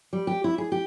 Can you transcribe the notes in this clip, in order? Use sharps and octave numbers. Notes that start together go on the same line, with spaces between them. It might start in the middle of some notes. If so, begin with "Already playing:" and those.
G3
G4
E4
G#4
G4